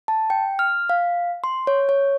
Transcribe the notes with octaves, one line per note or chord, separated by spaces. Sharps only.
A5
G5
F6
F5
C6
C#5
C#5